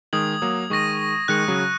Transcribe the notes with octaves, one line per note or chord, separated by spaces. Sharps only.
D#3 G#3 D#6 G#6 F#7
F#3 A#3
D#3 G#3 C#6 A#6 D#7
D#3 G#3 F#6 A#6 C#7
C#3 F#3